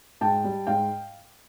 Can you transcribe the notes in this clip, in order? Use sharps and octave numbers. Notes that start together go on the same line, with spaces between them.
G#2 G5 A5
G3
G#2 F5 G5